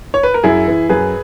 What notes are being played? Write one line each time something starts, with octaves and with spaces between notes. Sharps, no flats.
C#5
B4
A#4
F#2 E4 G#4
E3
F#2 G#4 B4